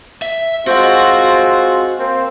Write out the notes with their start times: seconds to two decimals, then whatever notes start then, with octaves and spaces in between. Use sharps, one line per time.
0.22 E5
0.67 G#3 C4 F4 F#4 F#5
1.99 A#3 C4